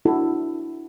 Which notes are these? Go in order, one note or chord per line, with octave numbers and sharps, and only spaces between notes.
D4 E4 F#4 A4